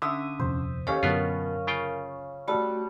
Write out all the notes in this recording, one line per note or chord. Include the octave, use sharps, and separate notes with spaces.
D3 C#4 E5 D#6 E6
D#1 F2 C3 C5
D#2 C#4 G4 A4 C#5 F5
F#2 B2 D3 F#3 B3 F4 A#4
C#3 F4 G5
G3 A3 F#4 A4